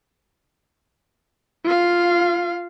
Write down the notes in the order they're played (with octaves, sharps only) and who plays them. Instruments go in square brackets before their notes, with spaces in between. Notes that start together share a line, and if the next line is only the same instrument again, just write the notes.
[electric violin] F4 F5